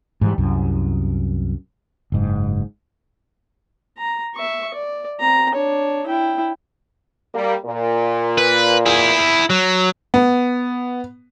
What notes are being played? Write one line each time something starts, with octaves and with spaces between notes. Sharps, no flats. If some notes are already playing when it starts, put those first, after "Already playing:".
G#2 E3 G3
C2 F#2
F#1 G#2
A#5
E5 C#6
D5
C4 A#5
D4 C#5
E4 G5
G3 A#3
A#2
B4
E4 G#4
F#3
B3